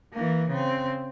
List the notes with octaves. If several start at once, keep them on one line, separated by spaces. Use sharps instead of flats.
E3 A#3
C#3 C4